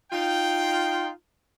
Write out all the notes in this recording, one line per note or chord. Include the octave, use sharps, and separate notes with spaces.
D#4 F4 G5